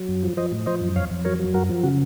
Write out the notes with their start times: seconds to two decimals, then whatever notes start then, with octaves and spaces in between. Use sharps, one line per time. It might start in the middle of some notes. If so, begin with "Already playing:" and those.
Already playing: F#3
0.08 F#2
0.23 F3
0.37 F3 C5 D#5
0.52 A2
0.66 F3 C5 D#5
0.81 F#2
0.96 F2 C#5 F5
1.11 F2
1.25 F#3 A#4 C#5
1.39 F#3
1.54 F#2 F#4 A#4
1.69 F3
1.83 C#3 F#4